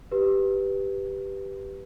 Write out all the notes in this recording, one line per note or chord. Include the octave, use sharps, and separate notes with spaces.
G4 B4